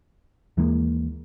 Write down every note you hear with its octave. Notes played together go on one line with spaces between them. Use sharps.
D#2 E3 G#3 A#3